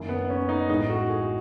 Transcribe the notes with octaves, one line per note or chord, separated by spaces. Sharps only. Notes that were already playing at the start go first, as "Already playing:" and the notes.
Already playing: F#1 F#2 D#3
B3
C#4
D#4
A1 A2 G#3 D#4
F#4
G#4